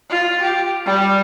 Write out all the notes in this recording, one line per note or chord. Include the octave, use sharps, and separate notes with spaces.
F4
G4
G3